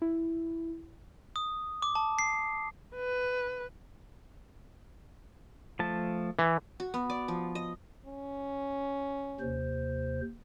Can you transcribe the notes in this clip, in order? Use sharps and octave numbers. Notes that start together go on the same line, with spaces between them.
E4
D#6
D6
A5
C7
B4
F3 A3 A5
E3
F#4
B3
D5
F3
D#5
C#4
D#2 C3 C5